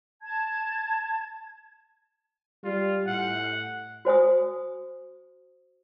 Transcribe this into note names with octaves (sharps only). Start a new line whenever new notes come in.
A5 G#6
G3 F4
A2 F#5
F#4 C5 G#5 D#6